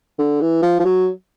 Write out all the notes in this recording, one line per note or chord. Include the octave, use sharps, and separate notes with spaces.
D3
E3
F3
F3
F#3